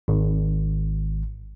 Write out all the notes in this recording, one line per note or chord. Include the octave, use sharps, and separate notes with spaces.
G#1